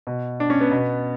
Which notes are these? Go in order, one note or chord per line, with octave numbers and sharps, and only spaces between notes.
B2
D4
C#4
B3
B2